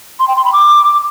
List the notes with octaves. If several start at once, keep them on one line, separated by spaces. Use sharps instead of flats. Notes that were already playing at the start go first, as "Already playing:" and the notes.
C6
G5
C6
B5
D6